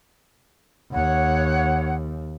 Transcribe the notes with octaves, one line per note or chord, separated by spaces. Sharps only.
D#2 C#5 F#5